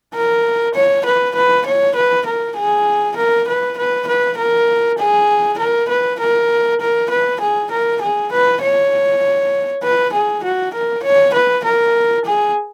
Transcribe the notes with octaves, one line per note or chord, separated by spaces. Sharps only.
A#4
C#5
B4
B4
C#5
B4
A#4
G#4
A#4
B4
B4
B4
A#4
G#4
A#4
B4
A#4
A#4
B4
G#4
A#4
G#4
B4
C#5
B4
G#4
F#4
A#4
C#5
B4
A#4
G#4